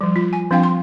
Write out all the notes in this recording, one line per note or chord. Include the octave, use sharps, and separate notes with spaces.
F3 G3
F4
G#5
F3 C4 D4 F4 F5 G5
C6